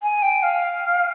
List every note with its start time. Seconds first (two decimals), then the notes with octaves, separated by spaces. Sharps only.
0.03 G#5
0.22 G5
0.43 F5